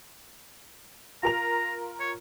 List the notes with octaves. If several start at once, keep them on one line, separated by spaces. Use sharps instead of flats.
F4 A#4 A#5 F7
C#5